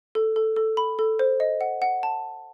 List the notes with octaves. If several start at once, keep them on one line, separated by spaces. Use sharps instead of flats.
A4
A4
A4
B5
A4
C5
D#5
F#5
F#5
A5